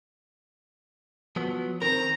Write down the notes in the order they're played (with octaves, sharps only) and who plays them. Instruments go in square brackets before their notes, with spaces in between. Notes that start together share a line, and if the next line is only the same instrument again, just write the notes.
[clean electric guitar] F3 F#3 B3
[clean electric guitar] D#3 C4 A#4 [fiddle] A#5